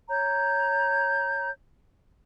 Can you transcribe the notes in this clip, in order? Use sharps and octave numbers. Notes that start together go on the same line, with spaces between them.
C#5 A#5 G6